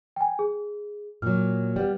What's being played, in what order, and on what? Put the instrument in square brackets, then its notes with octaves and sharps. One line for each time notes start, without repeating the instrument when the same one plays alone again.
[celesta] G5 G#5
G#4
[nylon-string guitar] A#2 F#3 [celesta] F6
[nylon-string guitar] G3 B3